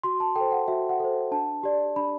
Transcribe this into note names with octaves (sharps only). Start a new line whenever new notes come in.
F#4 C6
A5
A4 C5 G5
F#5
F#4 E5
F#5
A4 C5
D4 A5
G4 D5
D4 B5